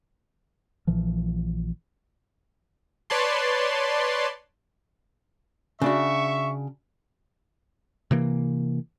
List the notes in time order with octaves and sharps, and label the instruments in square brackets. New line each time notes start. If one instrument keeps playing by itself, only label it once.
[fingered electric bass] A#1 A#2 E3 F3
[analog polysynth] B4 C#5 D5 A5 C6
[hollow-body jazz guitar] C#3 D4 F#4 [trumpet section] E5 C#6
[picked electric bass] C3 E3 A#3